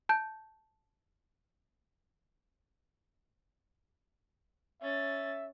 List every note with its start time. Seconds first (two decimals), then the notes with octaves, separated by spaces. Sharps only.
0.09 A5 G6
4.82 C#4 E5 A6